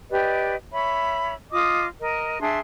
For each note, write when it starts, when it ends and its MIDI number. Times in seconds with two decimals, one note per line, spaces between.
0.11 0.55 67
0.11 0.55 71
0.11 0.55 74
0.11 0.55 75
0.73 1.34 73
0.73 1.34 76
0.73 1.34 83
1.51 1.86 65
1.51 1.86 75
1.51 1.86 86
1.51 1.86 87
2.01 2.38 70
2.01 2.38 75
2.41 2.59 62
2.41 2.59 68
2.41 2.59 76
2.41 2.59 84